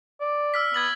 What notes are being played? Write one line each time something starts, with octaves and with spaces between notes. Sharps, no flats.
D5
E6 F6 B6
B3 G#6 A6 F#7